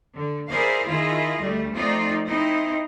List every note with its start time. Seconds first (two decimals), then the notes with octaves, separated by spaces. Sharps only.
0.16 D3
0.49 E4 G#4 A#4 C5 D5 F5
0.86 D#3 E4 F4 G#4 D#5
1.41 D2 G3 A3
1.74 F3 A3 C4 D#4 F4 D5
2.26 C4 D#4 E4 D#5